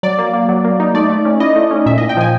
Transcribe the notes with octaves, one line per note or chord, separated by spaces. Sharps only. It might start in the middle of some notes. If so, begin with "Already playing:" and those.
F#3 D5
A#3
A#3
F#3
A#3
D#4
A3 D5
A3
C#4
E4 D#5
A3
C#4
A#2 E5
D#5
A#2
G5
F3 G#5